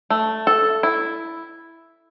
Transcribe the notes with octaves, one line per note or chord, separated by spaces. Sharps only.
A3
A4
E4